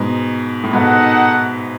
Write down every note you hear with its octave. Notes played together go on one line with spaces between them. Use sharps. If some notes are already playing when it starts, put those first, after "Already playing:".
Already playing: G#2 B2
A2
G#2 B2 D#4 A4 D#5 F#5